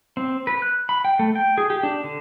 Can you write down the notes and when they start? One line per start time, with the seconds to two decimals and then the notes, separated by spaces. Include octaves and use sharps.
0.17 C4
0.47 B4
0.62 F#6
0.89 B5
1.05 G5
1.19 A3
1.35 G5
1.58 G#4
1.70 G4
1.83 D4
2.04 D3